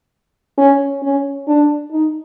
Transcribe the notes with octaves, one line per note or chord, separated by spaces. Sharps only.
C#4
C#4
D4
D#4